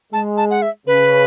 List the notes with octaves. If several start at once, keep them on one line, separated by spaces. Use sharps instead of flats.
G#3 A5
A5
F#5
E5
C#3 B4